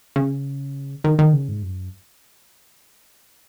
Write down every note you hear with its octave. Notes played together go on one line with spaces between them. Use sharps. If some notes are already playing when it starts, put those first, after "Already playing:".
C#3
D#3
D#3
C#3
G#2
F#2